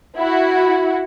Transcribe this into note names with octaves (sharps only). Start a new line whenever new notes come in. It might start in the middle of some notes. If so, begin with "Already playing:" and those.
E4 F#4